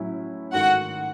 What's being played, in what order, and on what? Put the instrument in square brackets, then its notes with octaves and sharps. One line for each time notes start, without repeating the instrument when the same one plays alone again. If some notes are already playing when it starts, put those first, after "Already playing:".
Already playing: [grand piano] A2 F#3 C#4 E4
[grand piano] G#2 D#3 A3 [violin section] F#4 F#5